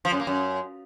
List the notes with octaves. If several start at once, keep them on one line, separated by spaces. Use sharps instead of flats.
F3
F#2
A#3
F#2